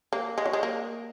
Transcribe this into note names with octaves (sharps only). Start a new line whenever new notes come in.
A#3
G#3
F#3
G#3
A#3